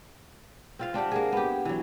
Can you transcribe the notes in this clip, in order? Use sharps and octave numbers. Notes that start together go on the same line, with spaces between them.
C4 F4 F5
C4 D4 G4 F#5
A#3 G#4
B3 G4
E3 F#3